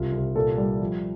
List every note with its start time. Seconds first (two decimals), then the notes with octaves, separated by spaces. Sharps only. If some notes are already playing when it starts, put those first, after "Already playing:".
Already playing: C2 F4
0.12 C2
0.35 A#2 A4
0.58 G3
0.80 F3